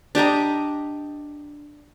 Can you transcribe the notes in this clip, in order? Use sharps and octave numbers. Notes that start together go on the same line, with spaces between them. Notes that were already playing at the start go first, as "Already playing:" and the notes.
D4 G4 D#5 A#5